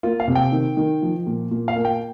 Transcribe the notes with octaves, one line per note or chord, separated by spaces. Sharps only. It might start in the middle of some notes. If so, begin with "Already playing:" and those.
A#3 F4
F5
C3
G5
D#3
D#3
F3
A#2
A#2
F5
A#3
G5